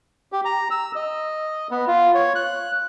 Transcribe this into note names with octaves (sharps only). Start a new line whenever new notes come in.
G4
A#5
E6
D#5
B3
F4
C#5
F#6